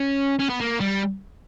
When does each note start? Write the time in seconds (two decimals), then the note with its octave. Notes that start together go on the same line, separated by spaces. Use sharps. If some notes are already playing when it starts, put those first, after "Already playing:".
Already playing: C#4
0.39 C#4
0.49 B3
0.60 A#3
0.81 G3